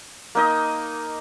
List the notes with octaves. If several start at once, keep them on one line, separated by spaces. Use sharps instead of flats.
A#3 D#4 D#5